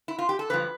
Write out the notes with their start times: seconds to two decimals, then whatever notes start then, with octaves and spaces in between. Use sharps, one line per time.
0.08 E4
0.19 F4
0.29 G4
0.39 A4
0.50 G2 D3 F3 B4